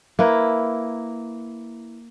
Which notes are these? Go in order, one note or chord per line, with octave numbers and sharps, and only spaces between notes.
A#3 E4 B4